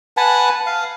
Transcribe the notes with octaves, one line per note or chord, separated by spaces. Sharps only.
B4 F#5 G#5 A5
F5